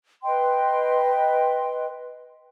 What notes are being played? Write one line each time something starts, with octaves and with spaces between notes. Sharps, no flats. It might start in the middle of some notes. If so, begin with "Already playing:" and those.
B4 D#5 G5 C6